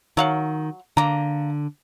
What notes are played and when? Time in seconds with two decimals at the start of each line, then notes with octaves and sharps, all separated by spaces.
0.17 D#3 F#3 F5 F#5
0.97 D3 A#3 A#5